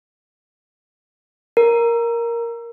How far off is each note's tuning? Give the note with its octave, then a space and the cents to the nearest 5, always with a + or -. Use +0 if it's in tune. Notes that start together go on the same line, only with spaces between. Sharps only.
A#4 +5